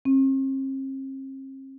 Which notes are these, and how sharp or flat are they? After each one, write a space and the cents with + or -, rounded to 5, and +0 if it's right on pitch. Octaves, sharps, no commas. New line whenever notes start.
C4 +45